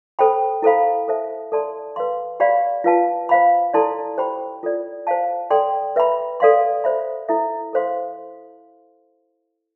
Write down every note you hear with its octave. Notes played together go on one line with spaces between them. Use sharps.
A4 C5 G5 B5
E4 A4 C5 F5 B5
A4 C5 E5 A5
A4 D5 A5 C6
B4 F5 C6
G4 D5 F5 B5
F4 B4 F5 A5
C5 F5 B5
E4 A4 D5 A5 C6
G4 C5 G5 B5
F4 A4 D5
C5 F5 A5
A4 D5 G5 C6
B4 E5 B5
A4 D5 F5 C6
C5 E5 B5
E4 A4 E5
A4 C5 F5 C6